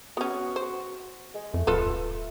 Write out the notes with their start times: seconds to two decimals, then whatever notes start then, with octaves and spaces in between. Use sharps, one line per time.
0.17 B3 C#4 F#4
0.56 C5
1.34 G#3
1.54 F2 A3
1.67 D1 F4 A4 B4